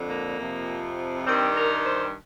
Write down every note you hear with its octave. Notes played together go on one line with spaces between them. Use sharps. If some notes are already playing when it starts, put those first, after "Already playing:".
Already playing: F2 D3
A#3
F2 C3 F3
G2 D#3 G3 C4
A#4
C5